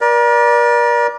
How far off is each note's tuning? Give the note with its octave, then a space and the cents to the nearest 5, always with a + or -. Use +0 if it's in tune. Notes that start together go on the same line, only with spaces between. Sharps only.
A#4 +40 D5 +0